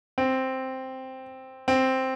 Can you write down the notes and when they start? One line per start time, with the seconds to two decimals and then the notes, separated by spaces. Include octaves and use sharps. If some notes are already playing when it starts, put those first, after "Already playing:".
0.18 C4
1.68 C4